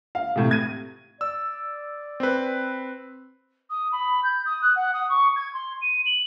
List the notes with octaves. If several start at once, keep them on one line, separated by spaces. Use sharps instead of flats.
F5
A2 C3
G#6 D#7
D5 E6
C4 B4
D#6
B5
G6
D#6
F#6
F#5
D#6
C#6
G#6
C6
D#7
F#7